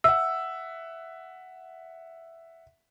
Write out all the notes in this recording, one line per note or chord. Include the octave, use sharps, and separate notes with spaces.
E5 F#5 E6